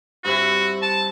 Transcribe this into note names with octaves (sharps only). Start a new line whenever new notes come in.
G2 C4 E4 F#4
A5